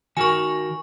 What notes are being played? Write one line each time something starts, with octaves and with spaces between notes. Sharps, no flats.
D#3 F#4 A#4 G#5 C#6